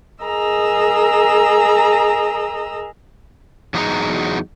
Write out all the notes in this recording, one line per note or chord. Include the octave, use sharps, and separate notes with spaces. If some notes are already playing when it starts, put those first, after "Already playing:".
G#4 A#4 D#5 A#5 E6
E2 F#3 D#4 F#4 G#4 A#5